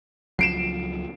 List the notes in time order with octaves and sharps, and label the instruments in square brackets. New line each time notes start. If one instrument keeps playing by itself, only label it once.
[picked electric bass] C#2 F3 F#3 [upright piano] C7 D7 E7